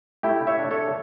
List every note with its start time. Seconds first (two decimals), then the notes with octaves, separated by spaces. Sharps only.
0.23 A3 E4 G4
0.47 C#5 E5
0.59 D4
0.71 A4 C#5